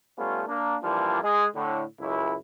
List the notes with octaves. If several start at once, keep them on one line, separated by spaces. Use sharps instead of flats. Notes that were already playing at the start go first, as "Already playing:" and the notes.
G3 A3 B3 C#4 F4
A#3 D4
E3 F3 G3 A#3 D4 F4
G#3 G#4
A2 D3
C#2 F#2 E4